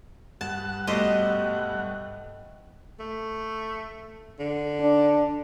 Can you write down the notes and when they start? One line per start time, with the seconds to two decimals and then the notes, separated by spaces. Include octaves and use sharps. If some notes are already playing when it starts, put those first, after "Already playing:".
0.41 G2 F#5 A5
0.87 B2 G3 A3 G4 C5 D#5
3.00 A3
4.39 D3
4.80 D4